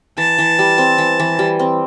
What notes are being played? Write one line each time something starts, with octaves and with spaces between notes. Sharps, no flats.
E3 A5
E3
G3
C4
E3
E3
G3
C4